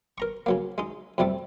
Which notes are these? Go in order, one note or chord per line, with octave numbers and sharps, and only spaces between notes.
A#4 A#5 C#6
C#3 F#3 A#3
G#3 D#4
F2 C3 G3 A3